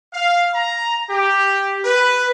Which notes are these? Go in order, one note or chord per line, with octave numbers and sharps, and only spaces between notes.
F5
A#5
G4
B4